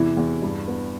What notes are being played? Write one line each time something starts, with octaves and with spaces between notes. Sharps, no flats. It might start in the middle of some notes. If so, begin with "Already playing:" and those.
Already playing: E2 C3 E3 E4
E2
G2
B3